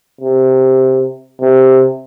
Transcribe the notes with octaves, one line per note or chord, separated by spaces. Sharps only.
C3
C3